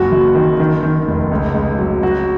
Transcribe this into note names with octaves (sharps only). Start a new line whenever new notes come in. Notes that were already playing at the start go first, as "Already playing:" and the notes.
Already playing: F#1 C#2 F#3 F#4
F#1
D#3
D#3
D#3
F1
C#2
C#2
F#3
F#3 F#4